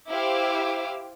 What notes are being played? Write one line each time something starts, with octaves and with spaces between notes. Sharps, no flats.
E4 G4 C5 F5 D6 E6